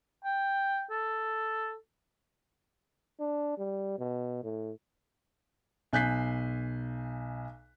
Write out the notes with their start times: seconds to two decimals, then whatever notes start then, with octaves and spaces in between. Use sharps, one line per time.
0.25 G5
0.91 A4
3.20 D4
3.58 G3
3.99 B2
4.44 A2
5.93 B1 G#5 F#6 G6 B6 C7